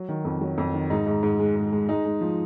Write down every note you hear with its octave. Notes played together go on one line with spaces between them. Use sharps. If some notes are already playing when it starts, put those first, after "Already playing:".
Already playing: F#3
D#3
F2
F#3
F2
D#3
G#2 D#4
G#2
G#2
G#3
G#2
G#3
G#3 D#4
G#3
F3